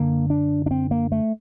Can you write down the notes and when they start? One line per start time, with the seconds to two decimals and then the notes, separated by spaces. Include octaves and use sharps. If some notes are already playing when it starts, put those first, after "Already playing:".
Already playing: F#2 D3 A#3
0.30 D4
0.66 D4
0.71 C4
0.91 A#3
1.12 A3